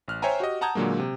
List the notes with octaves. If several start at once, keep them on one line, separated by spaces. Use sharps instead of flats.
A1 F6 F#6
C5 C#5 E5 G5 G#5 A#5
F#4 G4 D#5
F#5 A5 A#5 D#6 G6 G#6
A#2 D3 F#3 G#3 A#3
C3